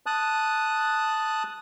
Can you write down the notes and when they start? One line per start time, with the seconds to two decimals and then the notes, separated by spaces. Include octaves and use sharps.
0.06 A5 D#6 F#6